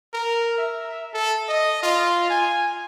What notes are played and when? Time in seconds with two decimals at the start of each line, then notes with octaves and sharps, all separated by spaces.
0.14 A#4
0.58 E5
1.14 A4
1.49 D#5
1.83 F4
2.30 G#5